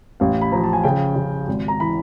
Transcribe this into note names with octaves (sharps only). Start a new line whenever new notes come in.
A1 F5
B5
F3 A#5
A5
G#5
C#3 G5
C#3
G#1
A#5
E3 B5